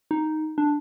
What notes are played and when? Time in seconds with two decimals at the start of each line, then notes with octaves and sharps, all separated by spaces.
0.11 D#4
0.58 D4